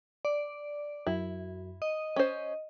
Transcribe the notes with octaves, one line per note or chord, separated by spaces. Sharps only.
D5
F#2 E4
D#5
C#4 C5